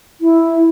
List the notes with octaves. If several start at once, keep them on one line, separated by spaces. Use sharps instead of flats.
E4